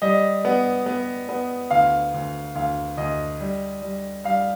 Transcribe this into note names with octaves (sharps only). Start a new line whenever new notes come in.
G3 D#5
B3
B3
B3
D2 F5
D2
D2 F5
D2 D#5
G3
G3
G3 F5